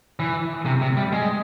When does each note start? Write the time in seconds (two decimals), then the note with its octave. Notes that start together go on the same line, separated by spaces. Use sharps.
0.20 E3
0.66 C3
0.82 C3
0.97 G3
1.12 G#3